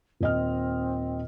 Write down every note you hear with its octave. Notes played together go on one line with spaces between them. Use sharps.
D#1 C4 D#5 F6